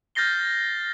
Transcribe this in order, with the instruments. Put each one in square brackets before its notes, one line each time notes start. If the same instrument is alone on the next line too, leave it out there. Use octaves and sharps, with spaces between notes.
[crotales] F6 G6 A6 A#6 C7 G7